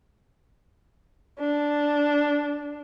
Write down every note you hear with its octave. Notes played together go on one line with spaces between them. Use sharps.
D4